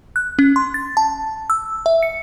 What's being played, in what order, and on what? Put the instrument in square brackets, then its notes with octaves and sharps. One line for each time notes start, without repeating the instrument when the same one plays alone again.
[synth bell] F#6
C#4
C6
A6
A5
E6
E5
C#7